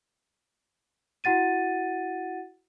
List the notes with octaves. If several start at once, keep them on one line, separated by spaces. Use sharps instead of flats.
E4 F#4 F#5 A6 D#7